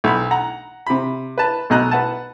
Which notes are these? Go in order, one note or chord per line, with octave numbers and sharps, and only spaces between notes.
B1 B5
F#5 A#5
C3 B5
B4 A5
B1 B2 D#5 A#5 F#6
B4 F#5 A5